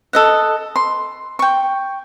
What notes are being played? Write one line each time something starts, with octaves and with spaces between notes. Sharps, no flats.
A4 D#5 F#5
C6
G5 C#6